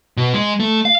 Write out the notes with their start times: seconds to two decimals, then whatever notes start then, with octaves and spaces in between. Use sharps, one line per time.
0.17 B2
0.34 G#3
0.60 A3
0.85 F5